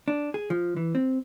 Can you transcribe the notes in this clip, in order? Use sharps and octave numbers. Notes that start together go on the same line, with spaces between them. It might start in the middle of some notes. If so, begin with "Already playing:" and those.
D4
G#4
F3
E3
C4